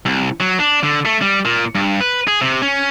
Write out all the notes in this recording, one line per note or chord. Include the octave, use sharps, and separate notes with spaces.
C2
F#3
D4
D3
A3
G3
A#2
G2
B4
G#4
C3
C#4